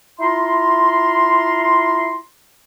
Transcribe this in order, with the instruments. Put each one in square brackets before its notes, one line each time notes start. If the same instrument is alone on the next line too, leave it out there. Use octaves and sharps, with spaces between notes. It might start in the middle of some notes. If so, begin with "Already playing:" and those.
[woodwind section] E4 F4 A#5 C6